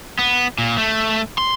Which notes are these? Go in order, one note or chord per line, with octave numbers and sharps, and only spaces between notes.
B3
A#2
A3
C6